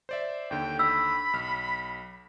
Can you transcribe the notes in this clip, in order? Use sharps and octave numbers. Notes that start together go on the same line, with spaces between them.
C5 D5 E5
D#2 D3 G5
B5 E6
B1 F6